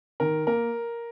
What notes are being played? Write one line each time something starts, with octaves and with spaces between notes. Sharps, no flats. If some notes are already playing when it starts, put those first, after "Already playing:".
D#3 A#4
A#3 A#4